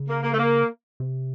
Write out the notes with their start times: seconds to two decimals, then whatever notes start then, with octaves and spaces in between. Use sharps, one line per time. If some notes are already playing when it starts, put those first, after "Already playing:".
Already playing: C#3
0.08 A#3
0.23 A#3
0.33 A3
0.38 A#3
1.00 C3